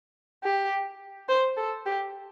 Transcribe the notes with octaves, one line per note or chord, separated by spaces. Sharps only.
G4
C5
A4
G4